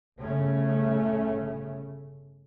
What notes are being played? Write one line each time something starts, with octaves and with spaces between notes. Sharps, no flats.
G1 A2 C#3 A3 C#4